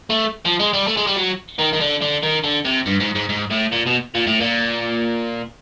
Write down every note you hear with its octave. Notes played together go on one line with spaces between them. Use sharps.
A3
F3
G#3
G3
A3
G#3
G3
F#3
D#3
D#3
D3
D3
D#3
D3
C3
G2
G#2
G#2
G#2
A2
A#2
B2
A#2
A2
A#2